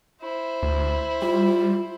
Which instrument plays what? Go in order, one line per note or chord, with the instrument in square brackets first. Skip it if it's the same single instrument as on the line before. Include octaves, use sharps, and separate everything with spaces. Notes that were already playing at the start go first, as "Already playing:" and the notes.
[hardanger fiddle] E4 C5
[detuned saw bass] D2
[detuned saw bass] G3 [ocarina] F4